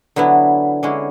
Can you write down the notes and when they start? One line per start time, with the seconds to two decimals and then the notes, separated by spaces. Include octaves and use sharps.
0.16 D3 F#3 B3 E4
0.83 D3 G#3 C#4 E4